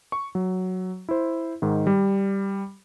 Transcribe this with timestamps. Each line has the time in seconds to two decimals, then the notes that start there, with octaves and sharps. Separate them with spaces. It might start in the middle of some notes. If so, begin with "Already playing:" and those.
0.12 C#6
0.35 F#3
1.09 E4 C5
1.62 G#2 D#3
1.87 G3